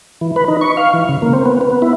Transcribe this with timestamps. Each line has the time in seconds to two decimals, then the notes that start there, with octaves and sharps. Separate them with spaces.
0.21 E3
0.36 B4
0.48 D#4
0.61 C#6
0.77 F5
0.94 E3
1.09 C#3
1.22 A#3
1.33 C4
1.46 B3
1.61 B3
1.82 E4